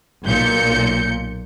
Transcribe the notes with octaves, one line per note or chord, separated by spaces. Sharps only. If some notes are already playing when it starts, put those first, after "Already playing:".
B1 A#2 G6 C#7